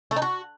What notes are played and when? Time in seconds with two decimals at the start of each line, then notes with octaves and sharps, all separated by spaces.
0.11 A3
0.16 D#4
0.22 F#4